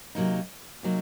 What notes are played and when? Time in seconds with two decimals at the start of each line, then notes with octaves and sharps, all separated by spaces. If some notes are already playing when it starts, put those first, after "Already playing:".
0.15 C3 F#3 A#3 D#4
0.83 C3 F#3 A#3 D#4